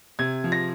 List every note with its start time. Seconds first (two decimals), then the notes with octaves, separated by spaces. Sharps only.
0.19 C3 G#6
0.44 F3
0.52 A#6